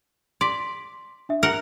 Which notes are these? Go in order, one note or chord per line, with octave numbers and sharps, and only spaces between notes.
D5 C6 B6
D4 E5
A#4 F#5